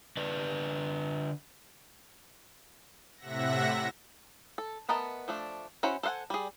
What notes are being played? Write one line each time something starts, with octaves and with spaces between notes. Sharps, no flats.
D3 B4 D5
A2 C3 E5 F#5 A#6
A4
A3 B3 A#4 D#5 A5
F3 A3 D4
C#4 E4 F#4 C5 F#5
A4 C5 F5 F#5 G#5
G3 G#4